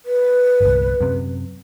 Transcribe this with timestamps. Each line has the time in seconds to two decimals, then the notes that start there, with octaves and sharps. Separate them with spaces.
0.06 B4
0.61 G1 C2
1.01 F#2 C3